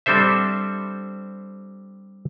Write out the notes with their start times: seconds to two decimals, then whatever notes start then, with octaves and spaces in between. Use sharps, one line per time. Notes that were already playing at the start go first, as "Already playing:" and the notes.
0.06 G3 C4 D4 A4 C5 E5